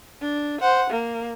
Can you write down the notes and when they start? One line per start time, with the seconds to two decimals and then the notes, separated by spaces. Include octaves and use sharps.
0.21 D4
0.61 C5 F#5
0.90 A#3